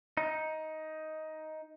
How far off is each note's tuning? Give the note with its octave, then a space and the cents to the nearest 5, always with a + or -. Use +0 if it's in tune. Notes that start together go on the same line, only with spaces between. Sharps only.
D#4 +10